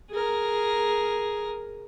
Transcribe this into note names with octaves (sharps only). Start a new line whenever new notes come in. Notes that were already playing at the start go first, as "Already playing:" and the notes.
G#4 A#4